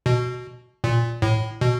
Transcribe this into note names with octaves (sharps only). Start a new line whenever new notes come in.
B2
A#2
A2
B2